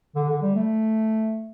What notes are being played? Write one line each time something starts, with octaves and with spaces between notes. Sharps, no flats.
D3
D3
G3
A3